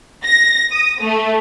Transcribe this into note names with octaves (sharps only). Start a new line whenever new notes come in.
A#6
D#6
A3